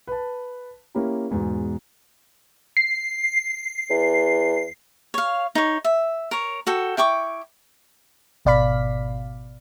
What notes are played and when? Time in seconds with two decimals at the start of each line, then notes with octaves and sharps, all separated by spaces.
0.07 B4 A5
0.95 A#3 C#4 E4 G4 A#4
1.31 E2 G#2 B2
2.77 C7
3.90 E2
5.14 C#5 F5
5.55 D#4 C#5
5.84 E5
6.31 A#4 C#5
6.67 F#4 A4 G5
6.97 E4 G5 C#6 D6
8.45 G#1 B2 D5 F5 B5 B6